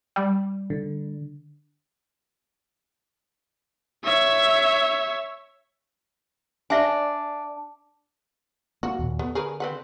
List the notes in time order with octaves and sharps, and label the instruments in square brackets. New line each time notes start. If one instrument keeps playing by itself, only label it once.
[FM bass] G3
[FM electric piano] D3
[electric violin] C#5 E5
[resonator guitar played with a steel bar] D4 [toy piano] D5 E5 G#5
[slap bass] A#3 [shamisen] F#4
[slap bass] D#2 A#2
[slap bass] D3 [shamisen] B3
[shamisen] G#4 A#4 B4
C4 B4 F#5